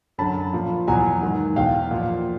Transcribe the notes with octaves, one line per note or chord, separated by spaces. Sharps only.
F#2 D3 F#3 A5 B5
A#2 F3
E2 B2 F#3 G#5 A#5
G#2 D#3 F#3
E2 B2 F#3 F5 G5
A#2 F3